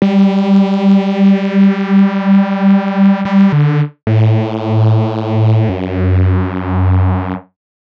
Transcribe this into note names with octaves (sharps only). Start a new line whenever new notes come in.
G3
G3
D3
A2
F#2